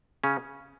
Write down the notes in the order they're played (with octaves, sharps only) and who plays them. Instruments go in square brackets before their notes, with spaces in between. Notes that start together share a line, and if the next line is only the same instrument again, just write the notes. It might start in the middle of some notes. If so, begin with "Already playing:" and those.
[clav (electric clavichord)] C#3 C#4